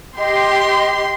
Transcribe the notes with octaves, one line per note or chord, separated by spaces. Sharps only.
G4 D#5 C6